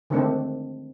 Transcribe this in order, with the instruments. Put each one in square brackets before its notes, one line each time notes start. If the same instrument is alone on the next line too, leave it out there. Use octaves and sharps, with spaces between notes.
[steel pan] D3 D#3 G#3 A3 C4 D4